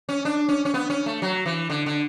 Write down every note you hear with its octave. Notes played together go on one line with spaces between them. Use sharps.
C#4
D4
C#4
C#4
B3
C#4
A3
F#3
E3
D3
D3